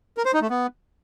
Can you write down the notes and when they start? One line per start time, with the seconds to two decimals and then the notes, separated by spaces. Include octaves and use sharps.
0.17 A#4
0.25 C5
0.34 D#4
0.42 A3
0.50 B3